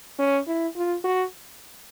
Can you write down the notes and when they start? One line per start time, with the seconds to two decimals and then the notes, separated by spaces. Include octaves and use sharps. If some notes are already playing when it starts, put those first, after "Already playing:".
0.19 C#4
0.47 E4
0.76 F4
1.04 F#4